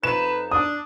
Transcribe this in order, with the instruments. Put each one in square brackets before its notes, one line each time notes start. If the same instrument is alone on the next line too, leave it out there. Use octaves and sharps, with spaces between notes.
[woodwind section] F2 D#4 [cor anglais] B4 [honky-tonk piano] E7
[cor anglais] D4 [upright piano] D#6